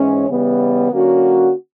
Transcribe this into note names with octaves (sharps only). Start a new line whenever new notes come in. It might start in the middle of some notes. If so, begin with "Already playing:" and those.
Already playing: G#2 E3 G#3 C#4
C#3 E3 G3 B3
D3 F#3 A#3 C#4 F#4